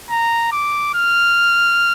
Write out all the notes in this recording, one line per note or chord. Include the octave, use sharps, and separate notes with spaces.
A#5
D6
F6